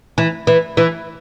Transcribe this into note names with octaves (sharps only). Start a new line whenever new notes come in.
E3
E3
E3